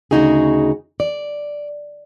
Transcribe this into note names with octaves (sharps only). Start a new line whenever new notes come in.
D2 C#3 D#4 F#4 G#4
D5